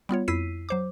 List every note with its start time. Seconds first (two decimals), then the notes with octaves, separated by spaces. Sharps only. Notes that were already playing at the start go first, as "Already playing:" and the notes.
0.09 G3 B3 F4 C#5
0.28 F2 E4 E6 B6 C7 D#7
0.69 F#3 C5 D6